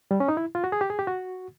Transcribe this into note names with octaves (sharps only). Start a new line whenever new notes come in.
G3
C#4
D#4
E4
F4
F#4
G#4
G4
G#4
G4
F#4